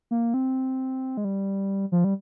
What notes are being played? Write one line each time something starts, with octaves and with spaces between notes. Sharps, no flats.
A#3
C4
G#3
G3
F3
G3